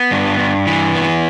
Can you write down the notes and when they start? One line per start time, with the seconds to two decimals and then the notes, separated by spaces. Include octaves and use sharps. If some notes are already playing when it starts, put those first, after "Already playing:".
Already playing: B3
0.11 G2
0.39 G2
0.67 E3
0.95 B3